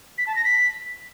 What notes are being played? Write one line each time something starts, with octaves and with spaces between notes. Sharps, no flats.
B6
A5
A#6
B6